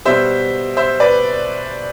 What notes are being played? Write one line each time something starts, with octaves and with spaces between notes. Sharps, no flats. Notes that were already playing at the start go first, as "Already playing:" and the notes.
B2 G3 C5 E5
C5 E5
B4 D5